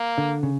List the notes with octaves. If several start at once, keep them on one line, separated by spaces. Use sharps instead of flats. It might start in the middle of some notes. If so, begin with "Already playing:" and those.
Already playing: A#3
D3
C#3